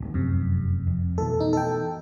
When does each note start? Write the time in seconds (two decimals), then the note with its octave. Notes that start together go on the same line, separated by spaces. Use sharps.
0.01 D1 G#1 D#2
0.14 F1 F#2 C3
0.87 F2
1.18 B2 E3 A3 A4
1.40 D#4
1.53 A4 G5